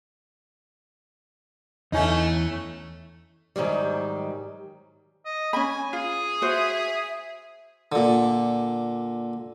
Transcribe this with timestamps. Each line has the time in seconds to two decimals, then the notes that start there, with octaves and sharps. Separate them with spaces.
1.92 E2 E3 A3 C#4 D#4
3.56 G#2 D#3 F#3 G3
5.25 D#5
5.53 C#4 G#5 B5
5.93 F4 G#4
6.42 F#4 C5 E5
7.92 A#2 D3